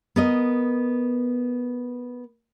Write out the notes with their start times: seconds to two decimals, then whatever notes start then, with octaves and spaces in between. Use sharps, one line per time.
0.16 B3 A#4 D#5